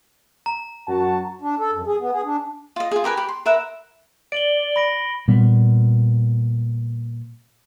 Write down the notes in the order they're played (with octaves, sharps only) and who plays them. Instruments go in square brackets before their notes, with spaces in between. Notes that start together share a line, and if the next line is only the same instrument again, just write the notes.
[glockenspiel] A#5
[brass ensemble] F#2 F#4 A5
[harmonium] D4
A4
F#2
G#4
B3
G#4
D4
[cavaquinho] F4 D#5
F4 G#4
G4 A#4 B4 G#5
G4 B5
C6
A#4 B4 E5 F#5
[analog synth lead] D5 [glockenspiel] D7 F#7 G7
[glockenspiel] B5 A#6 D7
[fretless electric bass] A#2 G3 B3